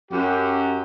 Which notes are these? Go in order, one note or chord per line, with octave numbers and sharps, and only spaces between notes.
F#2 G4